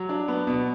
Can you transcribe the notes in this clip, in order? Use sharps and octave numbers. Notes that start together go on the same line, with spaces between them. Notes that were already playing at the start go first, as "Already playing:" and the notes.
Already playing: F#3
D4
B3
B2